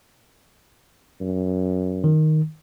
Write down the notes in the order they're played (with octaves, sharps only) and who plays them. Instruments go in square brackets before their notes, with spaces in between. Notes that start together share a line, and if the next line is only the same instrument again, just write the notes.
[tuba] F#2
[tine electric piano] D#3